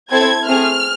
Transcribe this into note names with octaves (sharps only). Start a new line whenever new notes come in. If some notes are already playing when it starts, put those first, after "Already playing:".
C4 E4 A4 G#6
A3 C4 G#4 F6